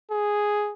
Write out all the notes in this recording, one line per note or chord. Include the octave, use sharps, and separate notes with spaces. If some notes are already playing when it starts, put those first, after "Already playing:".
G#4